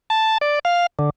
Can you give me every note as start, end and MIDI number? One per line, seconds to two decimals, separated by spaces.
0.10 0.38 81
0.41 0.59 74
0.65 0.86 77
0.99 1.10 50